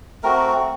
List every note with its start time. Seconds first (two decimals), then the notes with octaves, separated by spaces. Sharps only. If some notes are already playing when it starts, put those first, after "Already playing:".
0.23 A3 C4 F#4 A#4